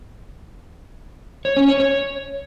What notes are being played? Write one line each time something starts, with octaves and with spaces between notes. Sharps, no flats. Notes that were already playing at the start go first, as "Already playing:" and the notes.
C#5
C#4
C#5
C#5